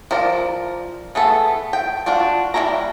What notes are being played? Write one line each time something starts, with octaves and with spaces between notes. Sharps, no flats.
F3 A#4 D5
A3 B3 G#4 A4
G5
D4 F4 F#4 D5
G3 E4 A4 C#5 A#5